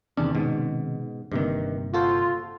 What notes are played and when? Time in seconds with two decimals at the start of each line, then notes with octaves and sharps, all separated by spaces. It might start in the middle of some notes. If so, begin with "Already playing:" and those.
0.17 E2 C3 D#3 C#4 D4
0.35 G#2 B2
1.32 G1 G2 C3 D#3 A#3
1.94 F4 F#4 A4 C5